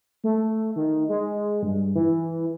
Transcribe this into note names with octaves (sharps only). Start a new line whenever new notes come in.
A3
D#3
G#3
G2
E3